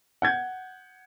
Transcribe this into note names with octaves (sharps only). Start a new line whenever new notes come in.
F#5 G6 G#6